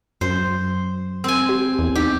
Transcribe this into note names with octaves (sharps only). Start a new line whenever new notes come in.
F#2 C5
C4 G#5
G4
E2
D#4 G4